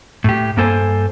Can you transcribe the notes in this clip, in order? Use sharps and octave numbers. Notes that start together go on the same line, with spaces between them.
A2 G4
G2 A#3 A4 C5 G#5